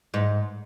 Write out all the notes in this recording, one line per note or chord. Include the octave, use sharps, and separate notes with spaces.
G#2